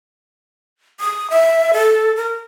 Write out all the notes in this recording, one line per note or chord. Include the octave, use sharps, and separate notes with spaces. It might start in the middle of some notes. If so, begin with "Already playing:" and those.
D#6
E5
A4
A#4